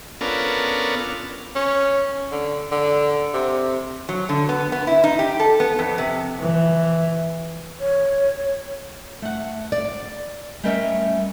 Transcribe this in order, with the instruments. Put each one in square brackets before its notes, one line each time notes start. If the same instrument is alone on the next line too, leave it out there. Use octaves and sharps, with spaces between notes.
[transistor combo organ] B3 C#4 D4 F4 A4 A#4
[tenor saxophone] C#4
D3
D3
C3
[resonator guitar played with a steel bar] F#3
D3
B3
B3
E4
D#4
G4
A4
B3
F2
C3
[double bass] E3
[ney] C#5
[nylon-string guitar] A3 F#5
D5
G3 A3 C#4 A#4 D#5 E5